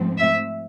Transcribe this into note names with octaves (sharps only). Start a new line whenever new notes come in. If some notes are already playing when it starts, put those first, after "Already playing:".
Already playing: G#2 F3 A3 C4
E5